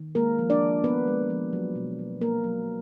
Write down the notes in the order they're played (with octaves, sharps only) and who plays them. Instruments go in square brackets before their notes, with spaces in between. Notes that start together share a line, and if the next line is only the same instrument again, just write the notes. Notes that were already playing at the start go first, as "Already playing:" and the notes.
Already playing: [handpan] D#3
G#3 A#3 A#4
F3
D4 D5
F3
B3 D4 B4
G#3
F3
F#3
B2
B2
A#3 D4 A#4
F#3